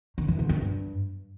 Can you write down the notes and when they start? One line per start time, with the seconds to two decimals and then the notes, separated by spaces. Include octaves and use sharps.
0.18 D#3
0.28 E3
0.39 G#2
0.49 G2